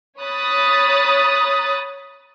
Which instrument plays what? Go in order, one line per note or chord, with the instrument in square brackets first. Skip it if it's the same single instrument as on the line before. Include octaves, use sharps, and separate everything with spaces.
[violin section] C#5 B5 D#6 F#6 A6